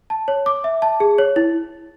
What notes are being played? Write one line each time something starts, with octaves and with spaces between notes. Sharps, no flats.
A5
C#5
D6
E5
A5
G#4
C#5
E4